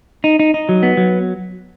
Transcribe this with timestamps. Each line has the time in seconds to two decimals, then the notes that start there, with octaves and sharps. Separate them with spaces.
0.24 D#4
0.39 D#4
0.54 D#4
0.69 F#3
0.83 B3
0.97 F#3